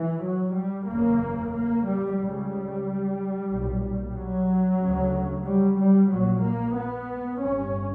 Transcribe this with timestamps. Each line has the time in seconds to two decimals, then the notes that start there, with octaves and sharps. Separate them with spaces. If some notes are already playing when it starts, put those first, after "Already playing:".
Already playing: E3
0.24 F#3
0.56 G3
0.89 F#1 E2 C#3 A#3
1.54 A#3
1.87 G3
2.19 C#2 C#3 G3
3.50 B1 A#2
4.15 F#3
4.80 D2 C#3
5.45 G3
5.78 G3
6.11 A#1 A#2 F#3
6.43 A#3
6.76 B3
7.41 G1 G2 C#4